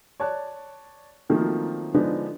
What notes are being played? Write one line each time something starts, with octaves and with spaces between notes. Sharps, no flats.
C#5 D5 A5 F#6
D#3 F3 F#3 A3 A#3 C4
D3 F3 G#3 B3 D4 D#4